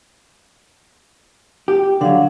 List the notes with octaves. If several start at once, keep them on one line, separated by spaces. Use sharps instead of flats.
G4
D3 F#3 D4 F5 F#5